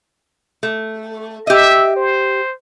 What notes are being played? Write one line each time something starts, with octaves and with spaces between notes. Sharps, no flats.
A3
G4 D#5 E5
C5